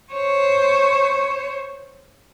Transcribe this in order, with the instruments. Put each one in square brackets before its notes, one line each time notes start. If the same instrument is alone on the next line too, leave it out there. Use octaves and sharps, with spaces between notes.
[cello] C5 C#5